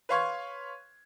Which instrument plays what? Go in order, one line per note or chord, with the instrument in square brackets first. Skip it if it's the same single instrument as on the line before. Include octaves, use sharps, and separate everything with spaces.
[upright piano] B4 C#5 F5 C6 C#6 G#6